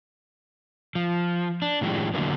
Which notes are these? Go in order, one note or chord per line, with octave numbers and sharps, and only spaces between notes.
F3
D4
A2 D#3 F3 G#3 C#4 G4
D3 F#3 A#3 B3